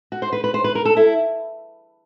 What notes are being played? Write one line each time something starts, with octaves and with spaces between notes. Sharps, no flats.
F#4
C5
B4
B4
C5
B4
A#4
A4
E4